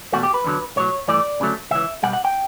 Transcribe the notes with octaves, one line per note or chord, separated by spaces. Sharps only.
E2 B2 A3 F#4
G4
B4
E2 D3 F#3
B1 A2 F#3 C#5
G2 E3 A3 D5
D2 C#3 F#3 A3
C#2 C#3 E3 E5
B1 B2 G3 F#5
F#5
G5